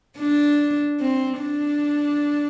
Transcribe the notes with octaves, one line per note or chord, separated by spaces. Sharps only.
D4
C4
D4